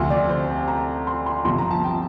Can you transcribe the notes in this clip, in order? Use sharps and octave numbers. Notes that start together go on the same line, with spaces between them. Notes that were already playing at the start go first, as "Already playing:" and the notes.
Already playing: D2 C3 F3 C6
D5
C5
A#5
C6
C6
G1 F2 C3 F3 C6
A#5
A5
G5